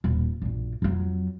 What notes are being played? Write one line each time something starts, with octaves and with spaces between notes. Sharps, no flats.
D#1
A#1 F#2
F2 F#3